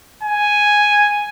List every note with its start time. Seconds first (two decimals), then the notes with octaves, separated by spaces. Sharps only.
0.23 G#5